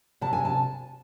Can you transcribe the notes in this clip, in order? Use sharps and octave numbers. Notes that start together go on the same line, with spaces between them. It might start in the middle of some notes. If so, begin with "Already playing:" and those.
C3 A5
G#5
A5